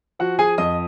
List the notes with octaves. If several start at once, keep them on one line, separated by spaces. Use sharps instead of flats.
F3 F#4 F#5
G#4 G#5
F2 D#5 D#6